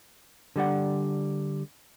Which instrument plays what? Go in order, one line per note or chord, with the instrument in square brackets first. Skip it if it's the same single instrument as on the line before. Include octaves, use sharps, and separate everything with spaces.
[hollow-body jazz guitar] D3 G3 D5 F#5